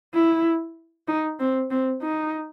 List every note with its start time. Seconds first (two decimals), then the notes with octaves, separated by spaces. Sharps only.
0.14 E4
1.08 D#4
1.40 C4
1.71 C4
2.02 D#4